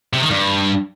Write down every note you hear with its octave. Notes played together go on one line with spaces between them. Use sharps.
C3
D#3
G2